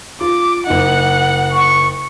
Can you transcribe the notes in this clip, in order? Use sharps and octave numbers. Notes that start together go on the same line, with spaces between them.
F4 D6
F#1 D#4 F#5
C#6